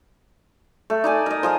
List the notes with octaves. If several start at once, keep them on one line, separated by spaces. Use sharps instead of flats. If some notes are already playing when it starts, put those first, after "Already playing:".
A3
D#4 D5 G#5
A#4 D#5
F3 G#4 D#5